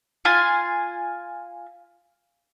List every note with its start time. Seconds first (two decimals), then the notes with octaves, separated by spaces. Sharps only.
0.25 F4 G#5 C6